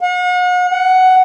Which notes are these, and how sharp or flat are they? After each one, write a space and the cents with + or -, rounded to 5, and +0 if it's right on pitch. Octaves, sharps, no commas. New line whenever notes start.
F#5 -40
F#5 +10